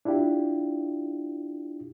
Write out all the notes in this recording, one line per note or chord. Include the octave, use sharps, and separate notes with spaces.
D4 E4 F4 G4